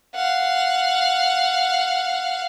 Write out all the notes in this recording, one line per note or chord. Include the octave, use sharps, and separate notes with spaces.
F5 F#5